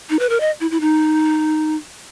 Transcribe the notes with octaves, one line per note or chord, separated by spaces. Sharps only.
D#4
B4
A#4
D#5
E4
E4
D#4